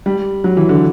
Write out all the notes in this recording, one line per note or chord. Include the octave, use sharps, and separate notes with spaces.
G3
F#3
E3
D3